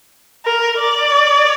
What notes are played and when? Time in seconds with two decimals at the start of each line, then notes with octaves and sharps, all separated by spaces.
0.45 A#4
0.79 D5